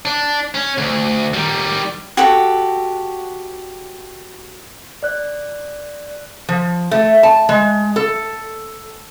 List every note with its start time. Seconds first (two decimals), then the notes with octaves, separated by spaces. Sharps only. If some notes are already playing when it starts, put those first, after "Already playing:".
0.05 D4
0.54 C#4
0.78 D2
1.34 D#3 G3
2.17 F#4 G4 A4
5.03 D5 F#6
6.49 F3
6.91 A3
7.23 A5
7.49 G#3
7.96 A4